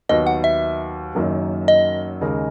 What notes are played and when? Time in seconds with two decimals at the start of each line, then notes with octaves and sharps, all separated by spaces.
0.09 D#2 D#3 F#3 B3 D#5
0.27 F#5
0.44 E5
1.15 F#1 F#2 D#3 F#3 A#3
1.68 D#5
2.21 D#2 C#3 G#3 D#4 A#4